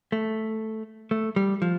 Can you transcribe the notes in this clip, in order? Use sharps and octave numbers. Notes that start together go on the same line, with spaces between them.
A3
A3
G3
F3